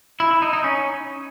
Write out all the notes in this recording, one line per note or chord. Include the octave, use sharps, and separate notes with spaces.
E4
E4
D#4
D#4
C#4